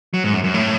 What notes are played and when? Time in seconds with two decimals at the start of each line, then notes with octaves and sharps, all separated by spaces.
0.14 F#3
0.24 G#2
0.33 F#2
0.44 F#2
0.54 A2